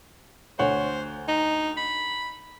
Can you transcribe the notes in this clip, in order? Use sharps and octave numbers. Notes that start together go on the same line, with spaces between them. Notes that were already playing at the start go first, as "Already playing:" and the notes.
D2 C5 C#5 F#5
D#4
B5